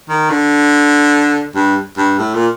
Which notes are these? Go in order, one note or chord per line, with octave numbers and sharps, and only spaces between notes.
D#3
D3
G2
G2
A2
A#2